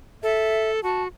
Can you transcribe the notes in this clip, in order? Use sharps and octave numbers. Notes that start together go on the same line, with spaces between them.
A4 E5
F#4 A5